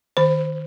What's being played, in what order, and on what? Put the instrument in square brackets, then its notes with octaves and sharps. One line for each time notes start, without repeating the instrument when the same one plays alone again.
[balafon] D#3 C5